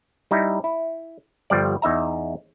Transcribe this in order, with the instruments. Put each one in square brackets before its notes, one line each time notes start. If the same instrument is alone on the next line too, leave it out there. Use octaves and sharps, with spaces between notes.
[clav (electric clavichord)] G3 D#4 E4
E4
G1 F3 G3 D5
E2 D#4 E5 A#5